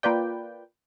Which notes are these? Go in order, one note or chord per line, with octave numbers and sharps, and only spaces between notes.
A#3 F4 B4 D5 G5